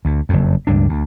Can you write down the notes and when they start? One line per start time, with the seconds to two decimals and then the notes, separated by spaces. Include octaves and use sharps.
0.05 D2
0.29 F#1 F2
0.67 C#2 G2 D4
0.89 D2